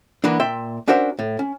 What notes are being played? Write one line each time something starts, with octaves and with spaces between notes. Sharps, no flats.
E3 A#3 B3 D4
A#2 E5 G5 C6
C#4 D4 F#4 A#4 C5 E5
A2
C#4